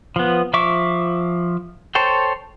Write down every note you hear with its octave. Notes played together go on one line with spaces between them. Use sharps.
F3 B3
F3 E5 C#6 D6
A4 C5 C#5 G5